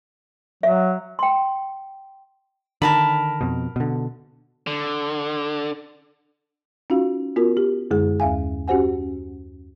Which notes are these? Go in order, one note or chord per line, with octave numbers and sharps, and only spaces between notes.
F#3 E5
G5 C6
D3 D#3 A#4 A5 B5
F2 B2
B2 D3
D3
C#4 D#4 F4 F#4 F5
B3 F4 F#4 A#4
G4
F#2 D3 G#3 G#4
D#2 E5 F5 G#5
C#4 F#4 G4 C5 F#5 G#5